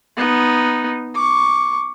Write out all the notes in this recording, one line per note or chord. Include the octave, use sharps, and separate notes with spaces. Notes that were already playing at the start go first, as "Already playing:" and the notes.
B3 D#4
C#6 D6